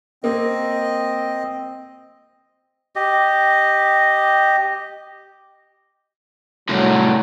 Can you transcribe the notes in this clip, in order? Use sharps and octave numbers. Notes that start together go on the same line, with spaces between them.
A#3 C4 D#5
G4 D#5
C2 A2 F#3